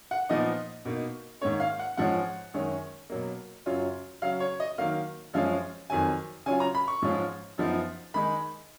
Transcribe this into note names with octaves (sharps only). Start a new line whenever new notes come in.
F#5
A#2 F3 B3 D#4 D#5
B2 A#3 D#4
G#2 D#3 A#3 C#4 C#5
F5
F#5
G#2 F3 G#3 C#4 F#5
F#2 D#3 G#3 C#4
B2 F#3 A#3
F#2 C#3 F#3 C#4 F4
C#3 F#3 C#4 F5
C#5
D#5
D#3 F#3 A#3 F5
F#2 F3 G#3 C#4 F5
F2 D#3 F#3 G#5
C#3 F#3 C#4 F4 G#5
A#5
B5
C#6
G#2 F3 G#3 C#4 F4
F#2 F3 B3 D#4
D#3 G#3 D#4 B5